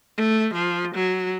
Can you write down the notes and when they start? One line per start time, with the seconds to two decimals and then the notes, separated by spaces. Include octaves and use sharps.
0.17 A3
0.54 F3
0.94 F#3